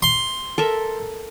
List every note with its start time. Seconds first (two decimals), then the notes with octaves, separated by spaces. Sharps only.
0.02 C6
0.58 A4 A#4 E5